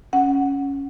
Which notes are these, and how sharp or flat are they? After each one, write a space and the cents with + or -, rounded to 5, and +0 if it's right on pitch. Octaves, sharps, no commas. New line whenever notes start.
C#4 +0 F#5 +0